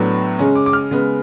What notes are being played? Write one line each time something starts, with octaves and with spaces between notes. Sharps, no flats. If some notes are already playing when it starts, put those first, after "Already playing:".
Already playing: A2 F#3 B3 D4
C#3 G#3 C#4
D6
D6
F6
C#3 G#3 B3